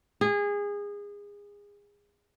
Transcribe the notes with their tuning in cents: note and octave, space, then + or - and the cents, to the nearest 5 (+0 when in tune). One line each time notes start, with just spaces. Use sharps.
G#4 -25